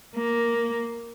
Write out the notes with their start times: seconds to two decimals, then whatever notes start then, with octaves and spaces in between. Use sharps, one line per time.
0.15 A#3